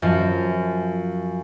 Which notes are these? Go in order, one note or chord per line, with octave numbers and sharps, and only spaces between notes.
F#2 F3